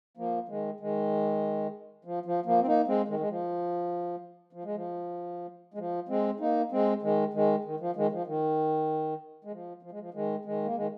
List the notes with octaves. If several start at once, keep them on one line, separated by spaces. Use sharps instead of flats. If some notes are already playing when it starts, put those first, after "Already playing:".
F3 A#3
D#3 G#3
D#3 G#3
F3
F3
F3 A#3
C4
A#3 D#4
G#3 C4
D#3 G#3
G#3
F3
F3
G#3
F3
G#3
F3
G#3 C4
A#3 D#4
G#3 C4
D#3 G#3
D#3 G#3
D#3
F3
D#3 G#3
F3
D#3
G#3
F3
F3
G#3
F3
D#3 G#3
D#3 G#3
A#3
D#3 G#3